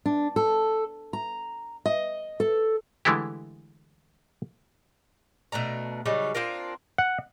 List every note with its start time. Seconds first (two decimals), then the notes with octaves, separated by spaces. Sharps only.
0.06 D4
0.36 A4
1.13 A#5
1.86 D#5
2.40 A4
3.05 D3 E3 G#3 A3 E4 G4
5.52 B2 A3 D4 A#5
6.06 C#3 F#3 G3 D#4
6.35 C4 D4 F4 A#4
6.98 F#5